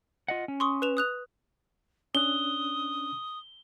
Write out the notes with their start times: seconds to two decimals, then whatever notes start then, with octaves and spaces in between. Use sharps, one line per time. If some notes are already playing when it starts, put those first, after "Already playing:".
0.28 F4 D#5 F#5
0.48 C#4
0.60 C6 C#6 D#6
0.82 B4 E7 F7
0.97 D#6 F#6 F7
2.15 C#4 D4 D#6 F#6 G7